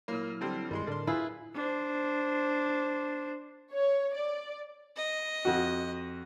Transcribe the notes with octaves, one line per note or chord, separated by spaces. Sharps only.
A#2 F#3 A#3 E4 F6
D3 G3 C4
G2 D#3 G3 G#3 E4 C6
A2 D3 D4 A#4 C6
E4 F4 G#4 B4
D4 C5
C#5
D5
D#5
F2 F#4